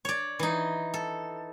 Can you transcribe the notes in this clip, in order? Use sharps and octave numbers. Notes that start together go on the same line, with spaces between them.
C#5 D5
E3 D#4
A4